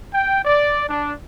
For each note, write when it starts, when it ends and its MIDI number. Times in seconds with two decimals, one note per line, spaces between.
0.14 0.40 79
0.45 0.84 74
0.89 1.14 62